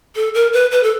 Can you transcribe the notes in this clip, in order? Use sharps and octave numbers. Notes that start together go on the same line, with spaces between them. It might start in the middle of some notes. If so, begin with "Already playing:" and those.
A4
A#4
B4
B4
A4